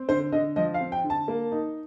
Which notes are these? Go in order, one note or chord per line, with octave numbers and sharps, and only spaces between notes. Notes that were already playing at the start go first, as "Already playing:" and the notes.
Already playing: C4
D3 C5
D3 D#5
F3 D#5
F5
C4
G5
D3
A5
A#3
D#4